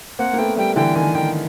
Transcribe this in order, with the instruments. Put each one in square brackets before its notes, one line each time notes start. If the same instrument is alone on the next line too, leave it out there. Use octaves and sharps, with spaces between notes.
[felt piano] A#3 C4 [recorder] F#5
[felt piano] A#3
[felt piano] A3 B3 [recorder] G5
[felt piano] G3 A3 [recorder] G5
[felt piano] D3 E3 [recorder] G5
[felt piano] D#3 [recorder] G#5
[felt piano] D#3 [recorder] G5